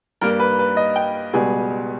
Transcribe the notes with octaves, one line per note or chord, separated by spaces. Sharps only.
G2 G3 A#3 A#4
B4
B4
D#5
G5
C#2 B2 G3 G#4